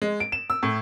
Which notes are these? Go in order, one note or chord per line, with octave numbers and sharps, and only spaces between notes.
G#3
D7
E7
E6
A2